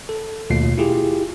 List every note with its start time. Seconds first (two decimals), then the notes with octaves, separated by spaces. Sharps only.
0.09 A4
0.50 D#2 B2 A3 F4 C7
0.78 E4 F4 G4 G#4